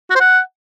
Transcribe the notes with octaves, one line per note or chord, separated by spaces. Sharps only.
F#4
C5
F#5